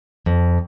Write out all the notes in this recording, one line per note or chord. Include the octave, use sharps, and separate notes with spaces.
F2